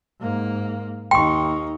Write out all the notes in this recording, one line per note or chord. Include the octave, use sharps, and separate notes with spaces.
G#2 A#3
D#2 D#4 G5 C6 C#6